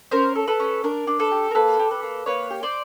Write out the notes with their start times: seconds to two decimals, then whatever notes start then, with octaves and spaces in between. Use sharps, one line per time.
0.11 C#4 A#4 C5
0.36 A4
0.47 A4 B4
0.60 C#4
0.84 D4 A#4
1.07 D4
1.19 A4 B4
1.31 G4
1.51 A#4
1.55 A#3 A4 B4
1.79 G4
1.91 A4 B4
2.03 A#3
2.26 A#3 B4 C#5
2.50 G4
2.63 C5 D5